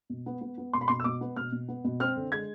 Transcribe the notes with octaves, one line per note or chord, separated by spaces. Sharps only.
B2
B3
B3
B3
B2 C6
B5
B2 C6
E6
B2 D6
B3
B2 F6
B2
B3
B2
C4 F6
D3
G#3 G#6